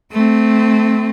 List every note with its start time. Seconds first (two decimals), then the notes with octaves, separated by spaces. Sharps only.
0.12 A3 C4